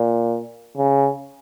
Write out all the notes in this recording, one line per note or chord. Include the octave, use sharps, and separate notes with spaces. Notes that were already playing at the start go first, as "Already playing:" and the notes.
Already playing: A#2
C#3